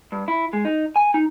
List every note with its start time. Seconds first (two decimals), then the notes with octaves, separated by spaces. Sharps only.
0.12 G2
0.28 E4
0.53 G#3
0.65 D#4
0.96 G#5
1.14 D#4